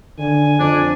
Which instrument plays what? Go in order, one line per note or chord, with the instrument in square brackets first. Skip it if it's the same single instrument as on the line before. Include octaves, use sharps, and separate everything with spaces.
[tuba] D3 [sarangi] G#5
[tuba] F2 [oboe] D4